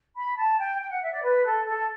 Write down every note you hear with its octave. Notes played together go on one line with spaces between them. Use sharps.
B5
A5
G5
G5
F#5
E5
D5
B4
A4
A4